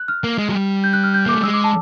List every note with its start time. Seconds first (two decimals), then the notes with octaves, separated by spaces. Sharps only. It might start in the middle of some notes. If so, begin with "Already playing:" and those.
Already playing: F#6
0.08 F6
0.24 A#3
0.38 G#3
0.49 F#3
0.54 G3
0.84 G6
0.93 F#6
1.04 F6
1.14 G6
1.26 A#3 D6
1.35 A3
1.43 G#3 E6
1.54 D6
1.64 A5